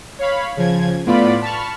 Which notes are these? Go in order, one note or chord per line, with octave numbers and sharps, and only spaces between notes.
C#5 F5 B5
C#3 F3 G#6
A2 B3 F4 D5 B5
A5 B5 C#6 F6